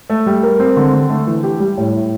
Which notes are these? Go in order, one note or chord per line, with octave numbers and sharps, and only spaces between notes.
A3
G3
A#4
C4
D3
D3
A3
E3
G4
G3
A2
E4